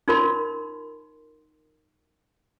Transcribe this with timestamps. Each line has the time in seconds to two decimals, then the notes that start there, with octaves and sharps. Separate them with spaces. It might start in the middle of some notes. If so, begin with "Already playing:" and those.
0.08 D#4 F4 A#4 C6